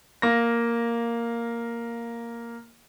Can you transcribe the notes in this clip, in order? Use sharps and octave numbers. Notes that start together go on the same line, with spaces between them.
A#3 A#6